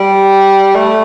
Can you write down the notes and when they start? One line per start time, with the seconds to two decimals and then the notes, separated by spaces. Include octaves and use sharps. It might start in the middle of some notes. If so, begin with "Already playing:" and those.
Already playing: G3
0.75 A3